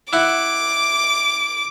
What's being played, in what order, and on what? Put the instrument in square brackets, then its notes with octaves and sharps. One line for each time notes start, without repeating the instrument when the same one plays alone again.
[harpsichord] E4 F#5 [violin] D6